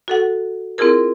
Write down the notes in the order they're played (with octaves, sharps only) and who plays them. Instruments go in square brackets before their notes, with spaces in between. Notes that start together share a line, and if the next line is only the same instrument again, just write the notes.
[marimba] F#4 A4 F#5
C4 E4 F4 G#4 A#4